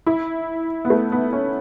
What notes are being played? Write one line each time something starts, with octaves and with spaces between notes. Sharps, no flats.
E4
B3
A3
B3
C#4